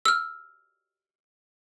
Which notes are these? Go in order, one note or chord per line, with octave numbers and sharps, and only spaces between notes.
E6 F6